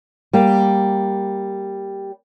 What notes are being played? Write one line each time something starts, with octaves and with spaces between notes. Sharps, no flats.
G3 A#3